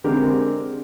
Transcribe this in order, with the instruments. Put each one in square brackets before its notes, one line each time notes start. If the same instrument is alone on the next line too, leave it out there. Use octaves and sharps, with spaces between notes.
[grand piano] D3 G#3 C4 G4 A#4